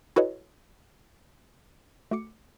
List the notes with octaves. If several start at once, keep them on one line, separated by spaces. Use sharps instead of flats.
E4 F#4 A4 B4 C#5 D#5
A3 F#4 D6 C#7